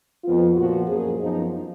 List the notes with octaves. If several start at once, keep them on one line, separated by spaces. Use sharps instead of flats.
F2 F3 B3 F4
A#2 F3 B3 F#4
F#2 F3 A#3 G#4
F#2 F3 B3 D#4